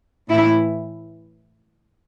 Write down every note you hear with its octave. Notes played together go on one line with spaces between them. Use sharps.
A2 E3 E4